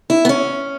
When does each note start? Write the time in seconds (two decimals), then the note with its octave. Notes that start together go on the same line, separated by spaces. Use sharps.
0.10 E4
0.25 B3
0.29 C#4